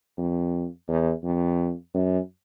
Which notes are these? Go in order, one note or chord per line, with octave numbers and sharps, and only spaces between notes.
F2
E2
F2
F#2